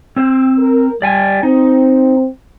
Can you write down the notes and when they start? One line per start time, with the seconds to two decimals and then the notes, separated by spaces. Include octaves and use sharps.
0.16 C4 C5
0.60 A#4
1.02 G3 D5 G5 G#5
1.43 C4 D#4